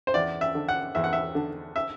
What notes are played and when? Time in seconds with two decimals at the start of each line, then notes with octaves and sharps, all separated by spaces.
0.07 C5
0.14 E2 D5
0.41 E5
0.55 D3
0.69 F#5
0.95 E2 E5
1.04 F#5
1.13 E5
1.35 D3
1.76 E5